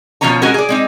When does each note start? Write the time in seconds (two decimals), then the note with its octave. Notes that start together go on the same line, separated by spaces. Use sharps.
0.21 B2 F3 G#3 C#4 C#5 A#5
0.42 G#3 C#4 F#4 G#4 A#4
0.54 G#4 D5
0.69 G#3 C4 D#4